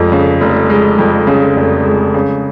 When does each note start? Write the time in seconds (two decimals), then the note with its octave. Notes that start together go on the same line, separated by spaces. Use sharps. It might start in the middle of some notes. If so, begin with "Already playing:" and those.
Already playing: F1 F2 G#3
0.12 C#3
0.41 F1
0.70 G#3
0.98 F2
1.27 C#3
1.56 F1
1.85 G#3
2.14 C#3